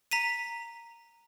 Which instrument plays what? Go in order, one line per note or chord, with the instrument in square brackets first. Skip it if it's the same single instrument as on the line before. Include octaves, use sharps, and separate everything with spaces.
[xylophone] A#5 B6 D#7